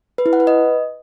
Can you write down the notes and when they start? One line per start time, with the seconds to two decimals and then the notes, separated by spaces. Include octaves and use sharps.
0.18 B4
0.26 E4
0.33 F#5
0.40 B4
0.47 D#5